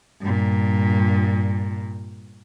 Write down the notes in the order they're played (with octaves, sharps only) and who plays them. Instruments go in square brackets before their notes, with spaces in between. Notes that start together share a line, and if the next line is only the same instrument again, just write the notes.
[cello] G2 A#2